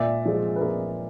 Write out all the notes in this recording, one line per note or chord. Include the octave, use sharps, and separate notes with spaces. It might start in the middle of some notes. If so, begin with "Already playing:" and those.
Already playing: A#2 D5 E5
F3 G#3
B4
A#2 G#4 A#4